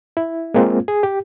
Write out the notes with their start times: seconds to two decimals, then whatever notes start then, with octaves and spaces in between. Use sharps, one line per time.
0.17 E4
0.54 G#3 A#3 C4 F4
0.88 G#4
1.03 G4